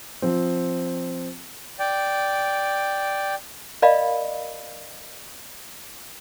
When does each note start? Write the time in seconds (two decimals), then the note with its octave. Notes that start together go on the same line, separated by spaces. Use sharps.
0.22 F3 C4
1.79 D5 G5
3.82 A#4 D5 D#5 F5 B5